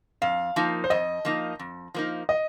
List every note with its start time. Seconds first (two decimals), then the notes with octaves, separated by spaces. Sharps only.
0.22 F2 F5
0.56 F3 A#3 D#4
0.84 C5
0.90 F2 D#5
1.25 F3 A#3 D#4
1.59 F2
1.94 F3 A#3 D#4
2.29 D#5